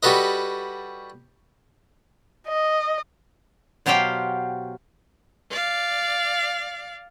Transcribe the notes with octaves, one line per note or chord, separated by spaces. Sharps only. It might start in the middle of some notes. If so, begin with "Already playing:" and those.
G3 F#4 A4 B4 D#5
D#5
B2 F#3 G4 C5 F5 G5
D5 F5